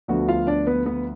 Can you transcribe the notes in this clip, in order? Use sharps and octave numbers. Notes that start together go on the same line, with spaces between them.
D2 D3 F3 B3 D4 F#4
F4 F5
D4 D5
B3 B4
B3 B4